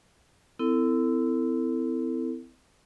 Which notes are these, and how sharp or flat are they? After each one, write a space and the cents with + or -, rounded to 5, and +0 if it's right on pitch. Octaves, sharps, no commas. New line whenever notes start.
C4 -40 E4 +0 A4 +30